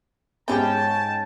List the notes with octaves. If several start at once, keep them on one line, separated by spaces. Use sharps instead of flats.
G#2 B3 C#4 G4 G#4 G5 A5